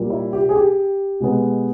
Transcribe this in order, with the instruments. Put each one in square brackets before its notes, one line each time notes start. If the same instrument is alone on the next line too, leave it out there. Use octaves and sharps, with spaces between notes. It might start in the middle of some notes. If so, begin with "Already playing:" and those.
Already playing: [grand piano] A#2 G3 A#3
E4
G4
G#4
G4
B2 G#3 B3